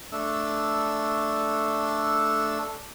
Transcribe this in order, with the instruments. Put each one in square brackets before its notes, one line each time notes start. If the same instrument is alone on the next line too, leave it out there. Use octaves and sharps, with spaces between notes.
[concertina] A3 D4 A4 E6